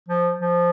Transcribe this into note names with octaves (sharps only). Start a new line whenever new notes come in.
F3
F3